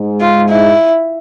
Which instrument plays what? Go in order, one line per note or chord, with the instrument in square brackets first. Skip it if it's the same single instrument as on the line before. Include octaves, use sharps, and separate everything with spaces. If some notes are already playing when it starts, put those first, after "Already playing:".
Already playing: [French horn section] G#2 G#3
[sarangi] F4
E4